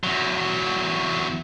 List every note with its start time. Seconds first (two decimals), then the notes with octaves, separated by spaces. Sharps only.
0.04 E2 F#3